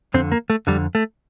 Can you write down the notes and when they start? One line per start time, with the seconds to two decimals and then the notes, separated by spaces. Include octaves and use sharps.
0.14 F2 D3 C4
0.32 A#3
0.50 A3
0.67 F2 D3 G3
0.95 A3